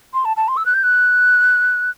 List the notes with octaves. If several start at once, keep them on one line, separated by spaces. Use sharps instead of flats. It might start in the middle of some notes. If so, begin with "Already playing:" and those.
C6
A5
A5
C6
E6
F#6
G6
F#6